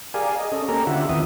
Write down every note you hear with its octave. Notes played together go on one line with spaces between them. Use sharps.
G4 G#4 A#4 D5 F5 G#5
D#5
C#4 A4 D#5
A#3 C#4 G4 A4 A#4 A#5
D3 F4 G4 E5 F#5
D#2 E3 C4 E5 D#6